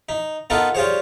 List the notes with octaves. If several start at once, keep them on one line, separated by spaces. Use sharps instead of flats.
D#4
B3 D#4 F4 A4 A#4
G3 F4 G#4 C5 C#5